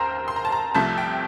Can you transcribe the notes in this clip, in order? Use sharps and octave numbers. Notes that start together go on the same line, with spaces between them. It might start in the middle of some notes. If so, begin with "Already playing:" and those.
Already playing: D#2 A#4 C5 A#5 C6
C6
A#5
A5
A#5
C2 C3 F3 A3 A5
G5